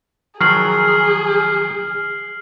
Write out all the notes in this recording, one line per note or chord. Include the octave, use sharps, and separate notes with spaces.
D#3 F3 F#3 G#4 F6 C7 F#7